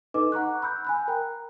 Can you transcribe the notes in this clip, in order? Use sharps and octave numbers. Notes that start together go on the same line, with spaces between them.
D#4 A4 B4 D#5 D6
F#5 A#5 C#6 F#6
B5 E6 G6
G#5 B5 F#6
A#4 G5 A#5